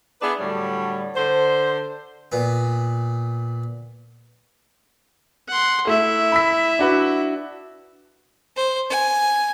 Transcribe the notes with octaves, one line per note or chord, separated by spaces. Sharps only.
B3 D4 E4 G#4 B4
A2 D3 F#3 G3 C#5
D3 C5
A#2 B3
F#5 C6
A3 E4 E5
B5 E6 B6
D4 F#4 B4
C5
G#5